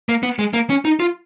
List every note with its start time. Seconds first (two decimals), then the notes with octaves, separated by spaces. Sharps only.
0.09 A#3
0.23 B3
0.39 G#3
0.54 A#3
0.70 C#4
0.85 D#4
1.00 F4